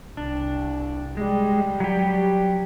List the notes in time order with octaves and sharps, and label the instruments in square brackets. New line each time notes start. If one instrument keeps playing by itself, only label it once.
[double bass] C2 [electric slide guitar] D4
[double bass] G3 [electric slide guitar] G#3
[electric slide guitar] F#3 G4